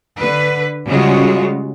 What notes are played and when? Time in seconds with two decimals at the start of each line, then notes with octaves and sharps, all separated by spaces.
0.18 D3 B4
0.89 C#3 G3 G#3 F4 F#4